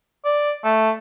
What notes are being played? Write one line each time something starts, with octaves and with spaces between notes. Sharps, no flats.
D5
A3